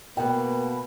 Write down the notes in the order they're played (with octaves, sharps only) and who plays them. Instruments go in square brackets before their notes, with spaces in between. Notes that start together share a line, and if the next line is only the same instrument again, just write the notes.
[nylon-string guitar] B2 B3 [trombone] A#3 [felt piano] G5 [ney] B5